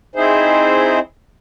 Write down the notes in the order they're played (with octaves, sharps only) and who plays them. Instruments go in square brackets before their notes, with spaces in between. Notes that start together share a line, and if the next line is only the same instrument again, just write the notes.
[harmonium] C4 D#4 E4 G#4 C5